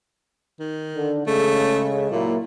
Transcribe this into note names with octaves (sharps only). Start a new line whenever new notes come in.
D#3
D3
C#3 G#3 A3
A#2 F#3 A#3 E4